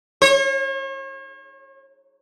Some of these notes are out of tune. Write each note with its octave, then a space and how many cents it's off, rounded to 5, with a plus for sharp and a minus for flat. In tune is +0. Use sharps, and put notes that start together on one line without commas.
C#5 -40